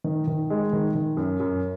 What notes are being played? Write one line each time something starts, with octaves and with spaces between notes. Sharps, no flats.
D#3
D#3
G#3
D#3
D#3
F#2
F#2